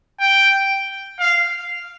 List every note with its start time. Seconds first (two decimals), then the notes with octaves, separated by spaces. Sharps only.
0.20 G5
1.20 F5